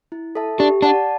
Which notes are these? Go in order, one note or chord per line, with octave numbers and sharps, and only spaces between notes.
E4
A4 E5 A5
D4 G4
D4 D5 F#5 A5